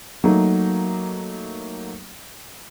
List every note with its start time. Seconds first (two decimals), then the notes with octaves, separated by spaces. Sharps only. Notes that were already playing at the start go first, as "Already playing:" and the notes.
0.24 F#3 A3 A#3 D#4